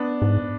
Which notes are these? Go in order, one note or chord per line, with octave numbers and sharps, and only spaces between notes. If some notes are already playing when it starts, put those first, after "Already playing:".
Already playing: B3 D4
G#2